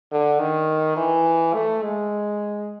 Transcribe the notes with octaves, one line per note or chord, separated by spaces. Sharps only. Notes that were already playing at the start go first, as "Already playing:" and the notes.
D3
D#3
E3
A3
G#3